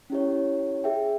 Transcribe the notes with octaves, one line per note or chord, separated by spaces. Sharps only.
C#4 E4 G4 C#5
G#4 E5 G5